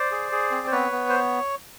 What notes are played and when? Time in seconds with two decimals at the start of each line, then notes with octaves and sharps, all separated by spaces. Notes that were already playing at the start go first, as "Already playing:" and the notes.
Already playing: C5 D5
0.11 G#4
0.32 G#4
0.51 C4
0.67 C5
0.71 B3 B4 C#5
0.92 B3
1.09 C5